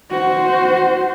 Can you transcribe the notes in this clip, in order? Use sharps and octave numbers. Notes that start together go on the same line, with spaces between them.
F#4 C5